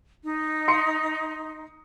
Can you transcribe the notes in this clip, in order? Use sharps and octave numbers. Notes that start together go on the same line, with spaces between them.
D#4
C6 D#6 C#7